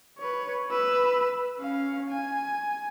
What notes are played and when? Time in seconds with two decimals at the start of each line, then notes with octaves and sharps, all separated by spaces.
0.19 B4 C#5
0.71 B4 E6
1.59 C#4 F5
2.10 G#5